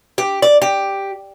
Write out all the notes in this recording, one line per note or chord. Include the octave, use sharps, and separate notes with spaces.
G4
D5
G4